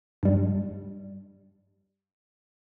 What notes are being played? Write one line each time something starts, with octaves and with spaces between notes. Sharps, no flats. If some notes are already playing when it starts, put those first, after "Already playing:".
G2 G3